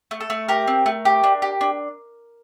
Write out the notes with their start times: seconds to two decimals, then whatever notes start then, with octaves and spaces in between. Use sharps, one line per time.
0.11 A3
0.21 A4
0.30 A3
0.49 G4 A#4
0.67 C4
0.86 A3
1.05 G4
1.24 D4
1.42 G4
1.61 D4